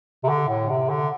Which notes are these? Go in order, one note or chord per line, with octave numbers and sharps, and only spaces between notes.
C3
D3
A2
C3
D3